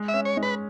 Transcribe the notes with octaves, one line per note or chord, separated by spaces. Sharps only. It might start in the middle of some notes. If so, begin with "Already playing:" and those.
Already playing: G#3
E5
C#4
C#5
G#3
B4